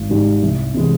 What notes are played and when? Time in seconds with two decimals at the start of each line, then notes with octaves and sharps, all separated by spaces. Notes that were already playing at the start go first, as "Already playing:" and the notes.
Already playing: G#1
0.10 G#2 D#3 G3
0.42 C2
0.74 C3 E3 G#3